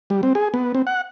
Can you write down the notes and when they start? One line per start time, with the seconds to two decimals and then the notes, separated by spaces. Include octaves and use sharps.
0.10 G3
0.23 C4
0.35 G#4
0.54 B3
0.75 C4
0.87 F#5